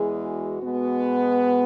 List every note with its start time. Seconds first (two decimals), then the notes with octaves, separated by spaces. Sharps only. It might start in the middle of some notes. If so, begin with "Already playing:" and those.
Already playing: E2 E3 G#3 G#4
0.22 F#4
0.62 B2 G#3 B3